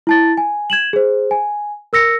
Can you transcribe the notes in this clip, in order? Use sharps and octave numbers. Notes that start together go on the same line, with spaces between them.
E4 A5 A6
G#5
G#6 E7 F#7
G#4 C5
G#5
A#4 E6 A#6 C#7